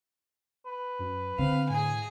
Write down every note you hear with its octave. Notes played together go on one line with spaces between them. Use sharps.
B4
F#2
D3 C4 F5
A2 G#4 G#5